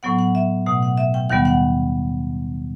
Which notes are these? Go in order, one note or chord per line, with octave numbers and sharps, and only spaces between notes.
A2 F#3 B3 F#5
F#5
E5
B2 A3 F#5
F#5
E5
G5
D#2 D#3 G3 B3 F#5
F#5